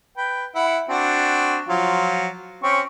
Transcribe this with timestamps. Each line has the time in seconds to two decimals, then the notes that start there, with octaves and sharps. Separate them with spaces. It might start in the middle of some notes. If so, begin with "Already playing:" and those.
0.17 B4 G5
0.55 E4 F#5
0.89 C4 D4 F#4
1.68 F3 F#3 F4
2.63 C4 C#4 C#6